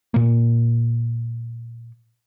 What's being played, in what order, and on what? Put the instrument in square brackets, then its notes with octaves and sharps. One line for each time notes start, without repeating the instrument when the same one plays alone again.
[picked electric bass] A#2 A#3